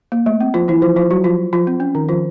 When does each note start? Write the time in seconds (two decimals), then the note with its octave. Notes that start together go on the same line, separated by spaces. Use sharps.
0.12 A#3
0.26 A3
0.41 C4
0.54 F3 F4
0.68 E3 E4
0.82 F3 F4
0.96 F3 F4
1.11 F#3 F#4
1.24 F3 F4
1.53 F3 F4
1.67 C4
1.80 C#4
1.95 D#3 D#4
2.09 F3 F4